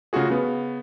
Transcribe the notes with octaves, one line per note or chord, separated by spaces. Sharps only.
C#3 A3 F4 F#4 G#4
C#3 B3